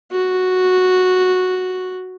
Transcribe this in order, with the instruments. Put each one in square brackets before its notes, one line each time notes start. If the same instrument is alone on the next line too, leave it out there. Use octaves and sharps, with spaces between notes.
[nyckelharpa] F#4